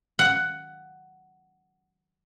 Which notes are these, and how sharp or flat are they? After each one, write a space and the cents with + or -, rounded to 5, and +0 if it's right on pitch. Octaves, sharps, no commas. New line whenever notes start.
F#5 +10